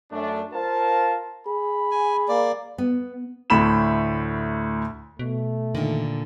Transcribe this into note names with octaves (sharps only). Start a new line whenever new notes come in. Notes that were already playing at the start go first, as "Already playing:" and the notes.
F#2 A3 D4
F4 A#4 C5 F5 A5
G#4 B5
G#5
A#3 D5
B3
D2 A2 B5 E7
B2 A3
A#2 D3 D#3